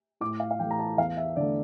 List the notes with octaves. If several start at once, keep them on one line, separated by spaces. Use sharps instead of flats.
A2 D6
F5
F5
E3 A3 G5
A#5
A5
E2 F5
E5
D3 A3 D5